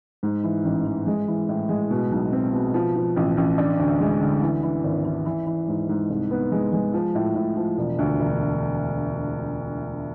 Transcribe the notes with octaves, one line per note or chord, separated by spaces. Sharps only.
G#2
E3
A1
E3
G#3
E3
A2
G#3
B2
B1
C4
B2
F3
F3
A1
A1
D4
D2
G#3
D3
E3
E3
G#1
E3
E3
E3
G#2
G#2
C2
B3
G#3
G#3
F3
A2
A2
F3
E1
D2
E1